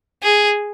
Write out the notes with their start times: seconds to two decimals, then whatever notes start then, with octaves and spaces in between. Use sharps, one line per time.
0.23 G#4